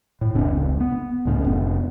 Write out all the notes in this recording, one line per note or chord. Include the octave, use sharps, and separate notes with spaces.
A2
F1 C#2 C4 D4
F1 C#2
B3
C#2 A2 G3 C#4
F1 B3